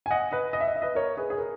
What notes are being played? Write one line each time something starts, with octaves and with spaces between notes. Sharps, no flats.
G#5
D#5 F#5
B4 D#5
D#5
E5
D#5
E5
B4 D#5
A#4 C#5
G#4 B4
G#4
A#4